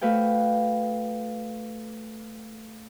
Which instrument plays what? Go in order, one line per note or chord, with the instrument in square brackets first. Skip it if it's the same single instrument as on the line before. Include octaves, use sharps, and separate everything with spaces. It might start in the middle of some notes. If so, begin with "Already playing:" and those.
[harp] A3 F#4 B4 F5 G5